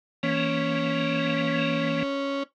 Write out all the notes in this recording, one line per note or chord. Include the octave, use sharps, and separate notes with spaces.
E3 A#3 C#4